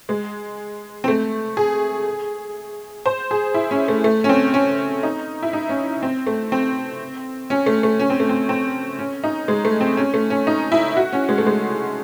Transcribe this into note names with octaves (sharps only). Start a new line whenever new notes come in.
G#3
C4
A3
G#4
C5
G#4
E4
C#4
A3
A3
C#4
C4
C#4
D#4
E4
D#4
C#4
C4
A3
C4
C#4
A3
A3
C#4
C4
A3
C4
C4
C#4
D#4
G#3
A3
C4
C#4
A3
C#4
D#4
E4
F#4
C#4
G#3
A3
G#3